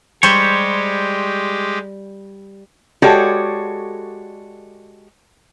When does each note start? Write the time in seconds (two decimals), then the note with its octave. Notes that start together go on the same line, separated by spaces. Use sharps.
0.23 G3 G#3 G4 C5 C#5
3.02 G#3 F#4 G4 A4 C#5 D5